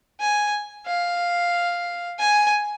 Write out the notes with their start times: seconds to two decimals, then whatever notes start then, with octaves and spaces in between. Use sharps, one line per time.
0.20 G#5
0.87 F5
2.19 G#5